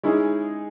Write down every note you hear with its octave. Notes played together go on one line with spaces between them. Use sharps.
G#3 C#4 D#4 E4 G#4